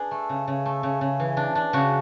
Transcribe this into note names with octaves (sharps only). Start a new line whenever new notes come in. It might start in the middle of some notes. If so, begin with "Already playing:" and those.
Already playing: D4 G#4 B4
A3
C#3
C#3
A3
C#3
C#3
E3
D4
D4
C#3 F#4